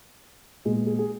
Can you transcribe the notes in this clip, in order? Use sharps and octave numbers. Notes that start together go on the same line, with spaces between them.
A#2 G#3 B3 G#4
G#4
G#4